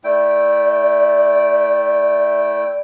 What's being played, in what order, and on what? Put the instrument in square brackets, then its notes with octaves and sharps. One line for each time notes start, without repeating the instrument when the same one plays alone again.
[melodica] A3 E4 G5 [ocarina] D5